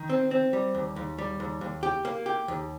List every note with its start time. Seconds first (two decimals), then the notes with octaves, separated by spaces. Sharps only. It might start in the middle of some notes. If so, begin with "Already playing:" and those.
Already playing: D#3
0.10 C4
0.31 C4
0.53 G3
0.75 D#2
0.96 D#2
1.18 G3
1.40 D#2
1.61 D#2
1.83 G4
2.05 A#3
2.26 G4
2.48 D#2